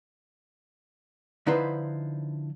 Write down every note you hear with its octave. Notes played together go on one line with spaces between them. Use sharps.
D3 F3 D#4 E4 B4 C5